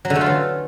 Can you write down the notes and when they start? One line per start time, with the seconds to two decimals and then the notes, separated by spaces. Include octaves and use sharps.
0.05 F#3
0.10 D3
0.15 A3
0.21 F4
0.26 E3